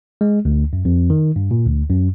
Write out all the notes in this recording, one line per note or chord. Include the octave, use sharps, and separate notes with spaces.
G#3
D2
F#2
F2
D#3
G2
A#2
D2
F#2